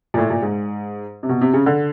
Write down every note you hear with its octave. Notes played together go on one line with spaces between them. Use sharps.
A#2
A2
A#2
G#2
C3
B2
C3
C#3
D3